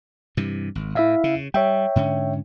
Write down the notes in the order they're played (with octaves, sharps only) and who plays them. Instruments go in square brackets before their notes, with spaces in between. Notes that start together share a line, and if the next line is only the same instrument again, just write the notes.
[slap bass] G2 C3 E3
G#1
[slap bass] A2 [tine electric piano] E4 E5 F5
[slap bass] C#3
[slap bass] G3 [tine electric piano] C#5 E5 G5
[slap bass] G#2 D3 C#4